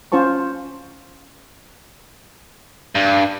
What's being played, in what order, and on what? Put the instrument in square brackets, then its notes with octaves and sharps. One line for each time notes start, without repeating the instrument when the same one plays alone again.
[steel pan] C#4 F4 C5 A5 C#6
[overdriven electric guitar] G2